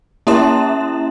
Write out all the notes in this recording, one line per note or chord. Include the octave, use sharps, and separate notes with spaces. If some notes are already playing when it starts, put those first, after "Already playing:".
A#3 C#4 E4 E5 C6 E7